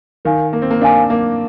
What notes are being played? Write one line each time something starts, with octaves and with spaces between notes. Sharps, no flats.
D#3 A#4 F5 G#5
A#3
C4
A#3
D4 A#4 F5 G#5
A#3